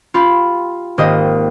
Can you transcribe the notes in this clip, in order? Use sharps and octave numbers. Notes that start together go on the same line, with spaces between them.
F4 G4 B5
G#1 A#3 G4 D#5